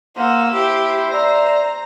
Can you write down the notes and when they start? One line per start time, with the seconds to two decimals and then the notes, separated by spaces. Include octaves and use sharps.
0.17 A#3 C5 F#5 E6
0.53 E4 G4 C5
1.12 D5 E5 A#5